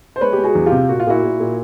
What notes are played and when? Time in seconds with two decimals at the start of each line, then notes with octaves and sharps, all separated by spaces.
0.16 C5
0.21 G#3 B4 C#5
0.33 G#3 G4
0.44 F#4 G#4
0.55 E2
0.66 F4 G4
0.72 C3
0.89 A#2 F#4
1.00 F4
1.07 A#2 E4 F#4
1.23 A#2
1.40 A#2